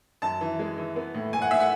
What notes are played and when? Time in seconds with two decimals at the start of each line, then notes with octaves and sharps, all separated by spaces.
0.22 F#2 A5
0.41 E3
0.59 G#3
0.78 E3
0.96 B3
1.14 A2
1.33 A2 G#5
1.42 F#5
1.51 A2 E5
1.60 F#5